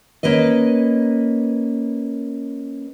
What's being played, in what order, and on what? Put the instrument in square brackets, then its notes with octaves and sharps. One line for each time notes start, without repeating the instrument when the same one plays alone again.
[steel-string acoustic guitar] A#3 C#4 B4 D#5